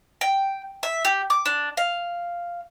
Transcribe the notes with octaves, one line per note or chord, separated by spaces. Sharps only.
G5
E5
G4
D6
D4
F5